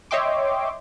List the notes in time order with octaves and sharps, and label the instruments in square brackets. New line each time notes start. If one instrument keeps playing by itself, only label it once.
[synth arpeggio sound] C#5 D#5 E5 G5 C6 D6